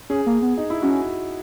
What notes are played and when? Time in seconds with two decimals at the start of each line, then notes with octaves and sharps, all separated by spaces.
0.10 C#4 G#4
0.26 A#3
0.42 B3
0.57 D#4
0.70 E4
0.82 C#4 F#4